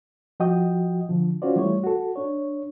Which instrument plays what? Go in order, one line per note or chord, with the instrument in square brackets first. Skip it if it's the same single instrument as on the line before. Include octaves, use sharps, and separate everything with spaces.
[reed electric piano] F3 F#4 D#5 G5 D#6
D3 F3
C#4 F4 F#4 C5 D5
E3 G3 A3 E4 C#5
F#4 A4
D4 C#5